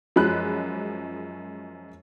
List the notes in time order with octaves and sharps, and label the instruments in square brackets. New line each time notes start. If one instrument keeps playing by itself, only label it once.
[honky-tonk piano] F#2 F3 F#3 G#3 B5 F#6